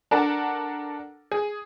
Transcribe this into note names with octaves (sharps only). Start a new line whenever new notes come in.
D4 A4 A#4 F#5 A5
G#4